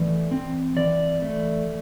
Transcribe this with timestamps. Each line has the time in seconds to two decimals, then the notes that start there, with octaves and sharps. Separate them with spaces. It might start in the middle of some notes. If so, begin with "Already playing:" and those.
Already playing: E3 A3 D5
0.31 C4
0.77 E3 D5
1.22 A3